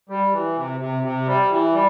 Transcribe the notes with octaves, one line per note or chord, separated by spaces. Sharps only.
G3
E3
C3
C3
C3
G3
E3
G3